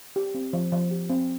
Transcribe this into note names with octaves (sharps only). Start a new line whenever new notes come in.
G4
C4
F3
F3
G4
C4